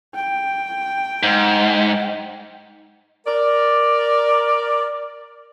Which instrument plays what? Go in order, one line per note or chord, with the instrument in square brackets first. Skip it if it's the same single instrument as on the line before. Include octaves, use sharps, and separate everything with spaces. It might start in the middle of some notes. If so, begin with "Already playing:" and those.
[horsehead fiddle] G5
[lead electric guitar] G#2
[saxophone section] A#4 D5